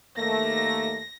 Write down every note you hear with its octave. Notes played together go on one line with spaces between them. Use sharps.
D#2 A3 A#3 A#6